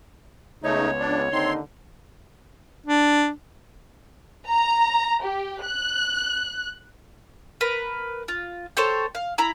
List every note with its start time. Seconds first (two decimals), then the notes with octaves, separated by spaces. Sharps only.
0.63 C#2 C#3 A3 B3 D#4 C#5
1.00 D4
1.32 D#2 D3 C4 D#4 C6
2.86 D4
4.48 A#5
5.23 G4
5.66 F#6
7.61 A#4 B4
8.28 F4
8.77 A4 C5 C#5 G5
9.15 F5
9.38 E4 A#5 B5